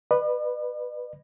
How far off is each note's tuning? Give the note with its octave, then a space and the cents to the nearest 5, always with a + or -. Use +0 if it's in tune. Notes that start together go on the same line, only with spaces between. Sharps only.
B4 +0 D5 +45